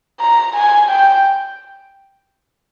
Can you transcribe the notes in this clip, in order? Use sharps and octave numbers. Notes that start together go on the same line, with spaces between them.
A#5
G#5
G5